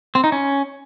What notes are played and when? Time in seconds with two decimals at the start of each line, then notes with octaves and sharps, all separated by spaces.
0.15 C4
0.24 D#4
0.32 C#4